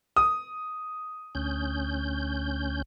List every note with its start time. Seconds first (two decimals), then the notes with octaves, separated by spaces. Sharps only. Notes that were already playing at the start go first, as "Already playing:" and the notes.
0.16 D#6
1.35 D2 C#4 G6